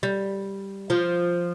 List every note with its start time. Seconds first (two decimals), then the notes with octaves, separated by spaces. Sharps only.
0.03 G3
0.90 F3